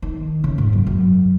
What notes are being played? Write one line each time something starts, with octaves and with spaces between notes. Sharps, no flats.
D#3
C#3
G#2
F#2
F#2